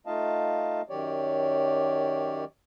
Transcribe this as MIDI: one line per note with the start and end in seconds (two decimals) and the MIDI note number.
0.06 0.82 57
0.06 0.82 63
0.06 0.82 65
0.06 0.82 75
0.06 0.82 77
0.06 0.82 81
0.90 2.45 42
0.90 2.45 51
0.90 2.45 54
0.90 2.45 67
0.90 2.45 73
0.90 2.45 74